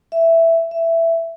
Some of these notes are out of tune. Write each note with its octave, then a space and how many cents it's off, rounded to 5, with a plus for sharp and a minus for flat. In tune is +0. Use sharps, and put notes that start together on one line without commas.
E5 +5
E5 +10